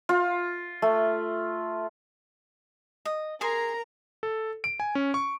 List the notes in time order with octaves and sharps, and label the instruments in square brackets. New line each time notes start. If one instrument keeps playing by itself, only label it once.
[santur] F4
A3
[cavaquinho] D#5
[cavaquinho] G#4 G#5 C6 [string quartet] A#4 A#5
[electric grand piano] A4
D7
G#5
C#4
C#6